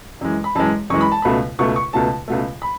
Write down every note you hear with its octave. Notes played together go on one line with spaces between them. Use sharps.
F#2 E3 G#3
B5
F#2 E3 G#3 A5
F#2 E3 G#3 C#6
B5
A5
C#2 B2 A3 B5
C#2 B2 A3 C#6
C#6
C#2 B2 A3 A5
C#2 B2 A3
B5